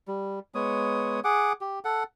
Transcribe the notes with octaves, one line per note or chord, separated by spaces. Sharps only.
G3
G#3 B3 C#5 D#6
G#4 F#5 D6
G4
A4 F#5